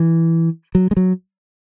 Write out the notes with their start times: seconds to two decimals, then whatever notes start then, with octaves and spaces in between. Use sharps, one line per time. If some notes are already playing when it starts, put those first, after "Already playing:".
Already playing: E3
0.75 F#3
0.91 G#3
0.97 F#3